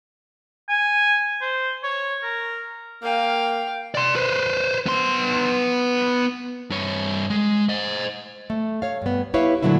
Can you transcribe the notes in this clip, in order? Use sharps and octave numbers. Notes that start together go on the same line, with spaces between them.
G#5
C5
C#5
A#4
A#3 F5 G5
D5 C6
B4 C5
B3 C6
G2 C#5
G#3
C5 D#5
A3
C#5 F5
G2 B3
E4 G4 B4 C#5 E5 F5
A#2 D3 D#3 F#3 A3 E4